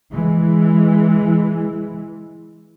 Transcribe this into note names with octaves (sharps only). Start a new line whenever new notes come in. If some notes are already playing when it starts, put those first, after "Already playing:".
E3 G#3